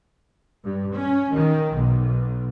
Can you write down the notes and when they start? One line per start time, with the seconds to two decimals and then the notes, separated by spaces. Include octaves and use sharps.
0.63 G2
0.95 C#4
1.35 D#3
1.75 B1